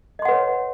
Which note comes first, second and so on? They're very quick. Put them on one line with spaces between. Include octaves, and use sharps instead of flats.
D#5 C6 F#5 B4 C#5